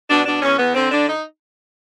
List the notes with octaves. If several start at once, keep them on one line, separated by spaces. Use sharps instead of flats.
B2 D4
B2 D4
E2 C#4
E2 B3
D3 C4
D3 D4
D#4